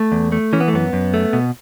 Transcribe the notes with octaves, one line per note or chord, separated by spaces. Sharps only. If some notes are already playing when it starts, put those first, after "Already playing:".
Already playing: A3
E2
A3
E3 C#4
B3
A3
F#2 B3
F#2
A3
B2